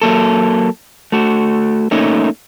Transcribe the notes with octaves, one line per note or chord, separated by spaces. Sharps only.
F#3 A#3 A4
A3 F#4
A3 A#3 C#4 D#4